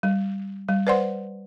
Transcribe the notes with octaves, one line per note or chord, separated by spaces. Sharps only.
G3
G3
B4 C5 D5 F#5 C6